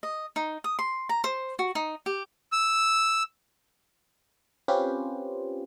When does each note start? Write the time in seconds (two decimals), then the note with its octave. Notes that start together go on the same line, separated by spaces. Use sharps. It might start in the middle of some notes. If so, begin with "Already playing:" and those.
0.03 D#5
0.36 D#4
0.64 D#6
0.79 C6
1.09 A#5
1.24 C5
1.59 F#4
1.75 D#4
2.06 G4
2.52 E6
4.68 C4 C#4 F4 G4 B4 C5